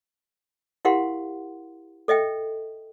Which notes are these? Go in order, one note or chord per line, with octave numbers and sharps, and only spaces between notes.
E4 G4 A#4 F5 F#5 C6
A4 D#5 E5 G5